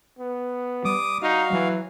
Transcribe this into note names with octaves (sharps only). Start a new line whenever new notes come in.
B3
G3 D6 D#6
D#4 F#4 F5
E3 F#3